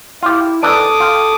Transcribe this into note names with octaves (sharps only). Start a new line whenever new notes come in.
E4 F4 G4
D#3 E3 D4 A4 D6 D#6
F4 G5